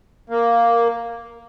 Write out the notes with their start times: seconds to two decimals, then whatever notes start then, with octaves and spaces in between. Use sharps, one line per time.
0.30 A#3